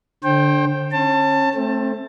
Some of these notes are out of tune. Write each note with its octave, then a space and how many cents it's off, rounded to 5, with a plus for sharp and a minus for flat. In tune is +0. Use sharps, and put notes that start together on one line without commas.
D3 -5 C5 +35 G5 +0
C#4 -30 A5 +20
A3 -5 C4 +20